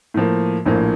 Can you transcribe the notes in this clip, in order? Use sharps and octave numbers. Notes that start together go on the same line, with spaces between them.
A2 F3 A#3
A#1 A2 F3 A#3